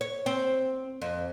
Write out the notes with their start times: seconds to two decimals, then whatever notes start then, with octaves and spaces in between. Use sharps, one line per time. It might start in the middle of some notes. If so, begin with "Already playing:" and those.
0.01 C#5
0.26 C4
1.02 F2